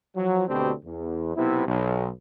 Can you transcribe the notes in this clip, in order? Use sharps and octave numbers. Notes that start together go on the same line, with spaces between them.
F3 F#3
D2 B2 C4 D4 G4
E2
B1 C3 B3 E4
B1